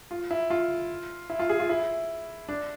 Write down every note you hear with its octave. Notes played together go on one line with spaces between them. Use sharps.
F4
E4
F4
E4
F4
G#4
F4
E4
D4